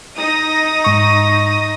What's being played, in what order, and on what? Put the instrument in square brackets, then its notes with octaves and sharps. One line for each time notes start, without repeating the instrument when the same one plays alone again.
[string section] D#4 D#6 A#6
[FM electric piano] G#2 C#6